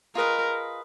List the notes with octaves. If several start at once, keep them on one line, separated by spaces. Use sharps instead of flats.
F4 G#4 A#4 B4 D#5